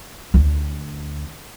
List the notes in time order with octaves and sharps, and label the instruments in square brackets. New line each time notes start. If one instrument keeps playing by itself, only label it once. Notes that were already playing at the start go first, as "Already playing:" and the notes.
[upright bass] D2 D3